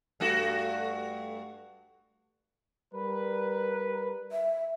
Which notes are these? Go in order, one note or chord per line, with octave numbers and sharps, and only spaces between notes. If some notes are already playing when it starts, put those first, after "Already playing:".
G2 A3 F#4
G3 A#4 B4
E5